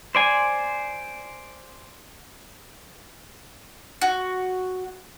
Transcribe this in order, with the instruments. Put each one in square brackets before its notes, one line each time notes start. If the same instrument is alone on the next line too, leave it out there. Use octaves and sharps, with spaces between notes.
[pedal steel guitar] C5 D5 G#5
[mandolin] F#4